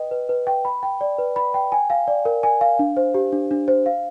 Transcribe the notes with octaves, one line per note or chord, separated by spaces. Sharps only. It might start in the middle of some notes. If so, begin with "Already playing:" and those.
Already playing: B4 D#5 G5
B4
B4
G5
B5
G5
D5
B4
B5
G5
G#5
F5
D5
A#4
G#5
F5
D4
C5
G4
D4
D4
C5
F5